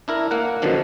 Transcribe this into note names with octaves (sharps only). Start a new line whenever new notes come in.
D4 E4 A#4
A#3 F#5
F#2 B2 D3 D#3 F3 D4